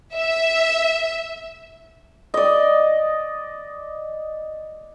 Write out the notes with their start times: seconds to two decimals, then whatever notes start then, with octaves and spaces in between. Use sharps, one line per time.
0.14 E5
2.34 D5 D#5